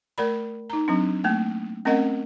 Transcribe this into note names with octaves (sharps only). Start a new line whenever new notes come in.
A3 A#4 D5 B5
D#4 A#5
F#3 C4 D4
A3 A#3 G5
A3 C4 C#4 A#4 D#5 F#5